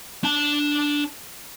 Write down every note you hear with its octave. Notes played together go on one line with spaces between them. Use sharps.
D4 A5